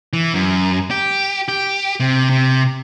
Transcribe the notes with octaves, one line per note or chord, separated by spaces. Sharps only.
E3
F#2
G4
G4
C3
C3